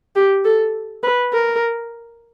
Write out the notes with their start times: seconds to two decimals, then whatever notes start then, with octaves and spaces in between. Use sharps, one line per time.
0.16 G4
0.45 A4
1.03 B4
1.33 A#4